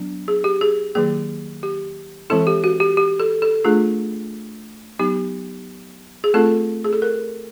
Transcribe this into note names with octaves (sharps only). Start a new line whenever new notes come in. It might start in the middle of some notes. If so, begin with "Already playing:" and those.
Already playing: F#3 B3 D4
G#4
G4
G#4
D#3 F#3 A#3 G#4
G4
E3 G#3 C4 E4 A4
G4
F#4
G4
G4
A4
A4
A3 D4 F4 G#4
F#3 B3 D#4 G4
G#4
A3 C4 F4 A4
G#4
A4
A#4